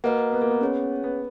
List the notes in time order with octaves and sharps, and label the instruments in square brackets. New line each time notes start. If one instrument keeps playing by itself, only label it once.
[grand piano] A#3 [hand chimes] F#4 B4 D#5 F#5
[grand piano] B3
A#3
B3
[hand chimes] C#4 G#4 C#5 F#5
[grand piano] B3